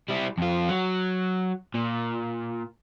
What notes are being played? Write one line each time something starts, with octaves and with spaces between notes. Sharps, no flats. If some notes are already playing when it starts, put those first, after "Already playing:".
G3 E4
F2 F4
F#3
A#2